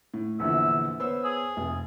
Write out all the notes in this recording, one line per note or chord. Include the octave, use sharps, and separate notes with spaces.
A2
A#1 E2 D3 E5
B3 C5 C#5 E6
G#4
F1